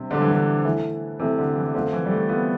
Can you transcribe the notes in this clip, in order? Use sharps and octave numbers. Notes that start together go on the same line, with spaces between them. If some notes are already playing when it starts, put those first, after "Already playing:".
Already playing: C3 G3 D4 C5
D3 G3 D4 A4 C5
E3
D3
E3 A3 E4
C3 E3 A3 E4
D3
E3
D3 A3 C4 F4
E3
G3
A3
A3 B3 C4 F4